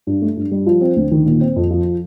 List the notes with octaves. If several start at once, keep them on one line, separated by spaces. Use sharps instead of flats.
G2
A3
G2
G3
F3
C4
D2
D#3
A#2
C4
F2
F3